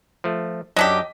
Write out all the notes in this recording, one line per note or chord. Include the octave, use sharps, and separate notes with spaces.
F3 A3
F#2 F#3 D4 G4 D#5 B6